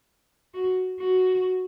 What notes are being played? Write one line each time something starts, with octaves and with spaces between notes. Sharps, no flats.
F#4
F#4